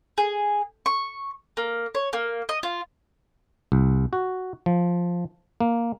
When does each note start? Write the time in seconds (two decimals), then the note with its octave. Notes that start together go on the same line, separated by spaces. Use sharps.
0.18 G#4
0.86 C#6
1.57 A#3
1.95 C#5
2.13 A#3
2.49 D#5
2.63 F4
3.72 C2
4.13 F#4
4.66 F3
5.60 A#3